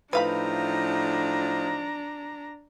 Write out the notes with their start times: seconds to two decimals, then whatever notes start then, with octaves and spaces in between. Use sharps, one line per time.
0.13 A2 F3 D4 D#4 B4 F5 A#5 B5